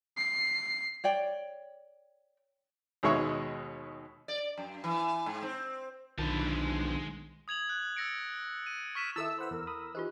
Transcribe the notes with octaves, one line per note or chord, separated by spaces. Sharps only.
C7
C#5 D5 G5
D#2 B2 G#3 C#5 E5
D5
F#2
E3
G#2
C4
B1 D3 D#3 F3 B4 A5
G#3
D#6 G#6 F7 F#7
F#6
E6 A6 A#6 C#7 D7
D#7
C#6 F6 B6 D#7 E7
D#3 E4 A4 E5 A5 E6
B4 C5 F#5 B5
E2 A#4
B5 D#6
E3 D#4 F4 G4 C5